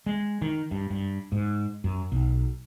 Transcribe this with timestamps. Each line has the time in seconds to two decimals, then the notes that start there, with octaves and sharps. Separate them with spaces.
0.06 G#3
0.42 D#3
0.71 G2
0.90 G2
1.32 G#2
1.84 F#2
2.12 B1